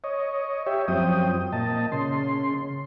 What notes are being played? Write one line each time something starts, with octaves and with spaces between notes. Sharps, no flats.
C#5 D#5
G4 C#5 E5
F#2 F3 C4 G5 D#6
A#2 D#5 A5
C#3 C6